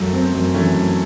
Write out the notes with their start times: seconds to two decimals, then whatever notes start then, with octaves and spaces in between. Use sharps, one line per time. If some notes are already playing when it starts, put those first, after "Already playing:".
Already playing: F#2 F#3 A3
0.13 C4
0.34 F#2
0.54 E3 A3 C#4
0.75 F#2